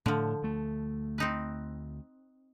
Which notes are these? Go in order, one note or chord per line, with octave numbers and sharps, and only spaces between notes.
A2 D3 F3
D2 A3
C4 D#4 B4